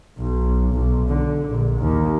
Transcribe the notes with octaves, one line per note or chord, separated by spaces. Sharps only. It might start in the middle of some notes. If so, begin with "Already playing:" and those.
B1
B1
D3
A#1
D#2